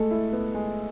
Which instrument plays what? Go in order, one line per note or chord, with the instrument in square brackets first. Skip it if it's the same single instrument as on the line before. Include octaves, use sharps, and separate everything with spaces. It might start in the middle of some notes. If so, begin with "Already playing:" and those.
Already playing: [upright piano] G#3 A4 [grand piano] A3
[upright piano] E4
B3
G#3